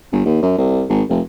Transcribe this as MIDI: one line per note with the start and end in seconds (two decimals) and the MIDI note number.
0.12 0.22 31
0.25 0.40 39
0.42 0.58 42
0.58 0.84 36
0.89 1.03 32
1.09 1.20 29